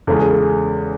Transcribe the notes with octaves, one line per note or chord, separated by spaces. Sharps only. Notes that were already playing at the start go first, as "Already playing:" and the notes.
E2 C#3 G#3 A4
G#4
A4